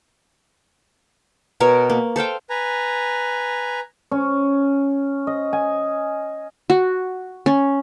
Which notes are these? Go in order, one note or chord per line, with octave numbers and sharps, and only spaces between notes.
B2 A#4 C#5
A#3
A4 C5 F5 G5
B4 G#5 A#5
C#4
D#5
G#5
F#4
C#4